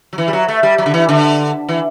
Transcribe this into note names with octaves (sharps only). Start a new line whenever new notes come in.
F#3
E3
G3
F#3
A3
G3
F#3
D3
E3
D3
E3